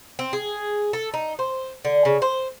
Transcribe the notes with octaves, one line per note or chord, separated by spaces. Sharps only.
C4
G#4
A4
D#4
C5
D3
C#3
C5